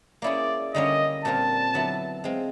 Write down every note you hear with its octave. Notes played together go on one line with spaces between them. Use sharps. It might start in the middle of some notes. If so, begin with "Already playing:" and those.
A#3 C#4 E4 G#4 D5
D3 G3 A#3 C#4 D#5
A#2 G3 C4 F4 A#4 A5
D3 F#3 B3 E4
G#3 C4 F4